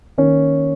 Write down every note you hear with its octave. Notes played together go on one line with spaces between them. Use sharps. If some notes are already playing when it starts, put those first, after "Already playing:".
D#3 A#3 C#4